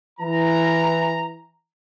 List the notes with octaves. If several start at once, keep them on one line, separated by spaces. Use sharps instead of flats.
E3 A#5